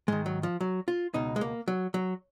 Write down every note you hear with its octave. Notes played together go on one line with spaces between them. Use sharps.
G#2 D#3 G#3
F#3
F3
F#3
F4
C#2 B2 D#4
G#3
A#3
F#3
F#3